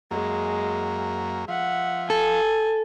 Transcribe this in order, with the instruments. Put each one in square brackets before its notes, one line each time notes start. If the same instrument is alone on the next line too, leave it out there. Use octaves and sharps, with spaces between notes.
[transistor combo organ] F#2 A#3 [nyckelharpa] G#3
[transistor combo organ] F3 [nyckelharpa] E5 F#5
[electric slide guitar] A4 [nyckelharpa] G#5